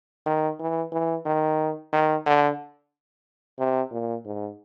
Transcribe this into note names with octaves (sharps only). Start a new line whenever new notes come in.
D#3
E3
E3
D#3
D#3
D3
C3
A#2
G#2